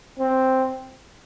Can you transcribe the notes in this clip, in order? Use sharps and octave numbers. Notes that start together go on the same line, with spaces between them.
C4